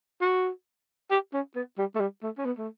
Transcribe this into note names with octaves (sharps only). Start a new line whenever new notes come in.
F#4
G4
C#4
B3
G3
A3
G3
A3
C#4
B3
A3